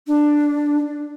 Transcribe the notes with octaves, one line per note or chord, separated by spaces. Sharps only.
D4